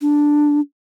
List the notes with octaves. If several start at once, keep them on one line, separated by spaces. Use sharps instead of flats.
D4